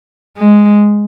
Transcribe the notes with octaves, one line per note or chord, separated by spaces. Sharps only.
G#3